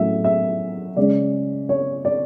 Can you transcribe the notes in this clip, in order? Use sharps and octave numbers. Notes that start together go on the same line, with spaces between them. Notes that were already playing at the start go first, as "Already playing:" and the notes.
Already playing: A2 F#3 A3 C#4 E5
E5
C#3 G#3 C#4 D5
C#5
D5